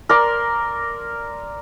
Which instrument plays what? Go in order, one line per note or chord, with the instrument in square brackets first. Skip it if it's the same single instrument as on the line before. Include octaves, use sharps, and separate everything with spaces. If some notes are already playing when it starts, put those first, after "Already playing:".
[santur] A#4 D5 C6